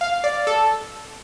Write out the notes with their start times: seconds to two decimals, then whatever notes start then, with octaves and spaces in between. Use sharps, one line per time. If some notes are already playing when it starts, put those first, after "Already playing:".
0.01 F5
0.24 D5
0.47 A4